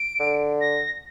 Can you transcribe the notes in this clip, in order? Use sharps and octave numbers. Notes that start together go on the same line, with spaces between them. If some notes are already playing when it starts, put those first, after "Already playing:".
Already playing: D7
D3
A#6